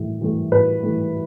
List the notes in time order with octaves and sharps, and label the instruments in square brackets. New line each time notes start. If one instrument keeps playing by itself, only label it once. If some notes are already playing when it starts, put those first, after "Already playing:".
Already playing: [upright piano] A2 E3
E3 A3
A2 B4
E3 A3